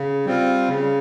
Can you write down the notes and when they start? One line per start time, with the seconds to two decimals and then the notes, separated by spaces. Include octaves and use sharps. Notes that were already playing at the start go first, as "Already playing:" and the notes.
Already playing: C#3
0.26 G3 C4 F4
0.68 C#3